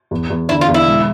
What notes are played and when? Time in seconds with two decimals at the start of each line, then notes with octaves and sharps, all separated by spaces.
0.11 E2
0.30 E2
0.49 D3 E4
0.61 F4
0.68 E2
0.74 E4
0.86 E1